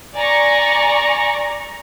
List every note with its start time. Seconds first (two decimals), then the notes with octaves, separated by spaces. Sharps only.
0.14 D5 G#5 A#5 C#6